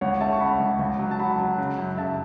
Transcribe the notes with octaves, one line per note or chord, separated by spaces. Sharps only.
C#2 C#5 F#5
C#3 E5 A5
C#6
C#3 F#5 B5
C#2
C#2
F#3
A5
F#3 F#5 B5
F#3
C#3
F#2
C#3 E5 A5